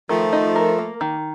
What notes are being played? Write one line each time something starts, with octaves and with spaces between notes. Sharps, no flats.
D#3 F3 A3
D#4
A#4
A#3
D#3